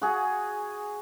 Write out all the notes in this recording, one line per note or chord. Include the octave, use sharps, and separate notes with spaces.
F#4 G#4